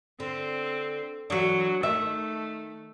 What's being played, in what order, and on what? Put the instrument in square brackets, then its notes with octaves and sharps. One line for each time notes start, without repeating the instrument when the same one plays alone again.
[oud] D3 [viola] C4
[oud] E3 D4 [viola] F#3
[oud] D#3 [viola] A3 [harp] E5